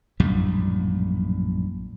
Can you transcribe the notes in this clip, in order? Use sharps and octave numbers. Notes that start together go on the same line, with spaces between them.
A#1 F#2 A2 G3